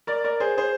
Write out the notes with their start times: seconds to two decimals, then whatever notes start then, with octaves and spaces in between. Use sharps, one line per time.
0.07 A#4 D5
0.24 A#4 D5
0.40 G#4 C5
0.58 G#4 C5